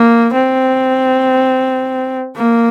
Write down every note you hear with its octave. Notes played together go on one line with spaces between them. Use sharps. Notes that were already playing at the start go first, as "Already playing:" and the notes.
Already playing: A#3
C4
A#3